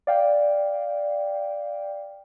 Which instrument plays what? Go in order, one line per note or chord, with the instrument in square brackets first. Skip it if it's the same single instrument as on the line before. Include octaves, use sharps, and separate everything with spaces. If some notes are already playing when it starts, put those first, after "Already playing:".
[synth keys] D5 F5 G5